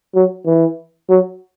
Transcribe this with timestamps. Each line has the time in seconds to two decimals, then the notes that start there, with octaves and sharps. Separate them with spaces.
0.15 F#3
0.46 E3
1.09 F#3